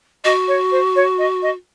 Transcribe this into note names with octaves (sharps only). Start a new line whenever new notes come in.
F#4 D#5
C#5
C5
C#5
D#5
D#5